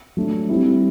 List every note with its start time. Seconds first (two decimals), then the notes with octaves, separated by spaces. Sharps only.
0.17 F#3 A3 D4
0.49 G3 C4 E4